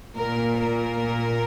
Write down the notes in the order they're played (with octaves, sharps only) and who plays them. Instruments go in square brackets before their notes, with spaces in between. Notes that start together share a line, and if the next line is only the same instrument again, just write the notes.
[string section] A#2 A#4
A#4